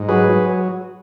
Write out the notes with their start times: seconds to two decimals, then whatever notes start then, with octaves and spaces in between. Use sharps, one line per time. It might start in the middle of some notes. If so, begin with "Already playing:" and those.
Already playing: G#2
0.09 F#3 G#4 B4
0.29 F#3